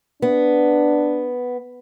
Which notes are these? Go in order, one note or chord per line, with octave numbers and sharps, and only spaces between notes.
B3 D4